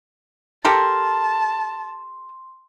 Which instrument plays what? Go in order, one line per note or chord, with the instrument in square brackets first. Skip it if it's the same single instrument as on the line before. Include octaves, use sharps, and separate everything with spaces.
[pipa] G4 A4 A#4 [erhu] A5 [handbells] C6